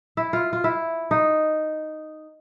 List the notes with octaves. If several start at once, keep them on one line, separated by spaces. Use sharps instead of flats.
E4
F4
F4
E4
D#4